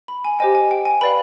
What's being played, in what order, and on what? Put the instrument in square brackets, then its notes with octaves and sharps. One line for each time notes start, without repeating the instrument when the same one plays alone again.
[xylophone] B5
G#5
G4 C5 D#5 G5 G#5
G#5
G5
G#5
B4 D5 F5 B5